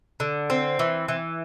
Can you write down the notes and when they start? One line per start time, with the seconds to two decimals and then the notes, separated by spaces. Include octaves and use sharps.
0.20 D3
0.50 C4
0.79 E3
1.08 E3